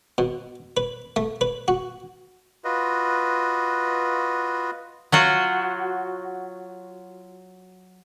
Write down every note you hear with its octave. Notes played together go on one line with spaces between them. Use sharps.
B2
B4
A3
B4
F#4
F4 F#4 B4 D#5
F#3 F4 F#4